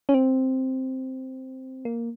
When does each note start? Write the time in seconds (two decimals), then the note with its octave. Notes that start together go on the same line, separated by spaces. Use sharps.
0.09 C#4
0.14 C4
1.85 A#3